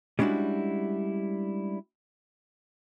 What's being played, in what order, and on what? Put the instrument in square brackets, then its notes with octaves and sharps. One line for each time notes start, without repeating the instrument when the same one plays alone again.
[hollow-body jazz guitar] G3 G#3 C#4 D4 E4 F#4